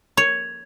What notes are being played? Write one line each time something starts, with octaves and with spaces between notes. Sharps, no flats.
C#5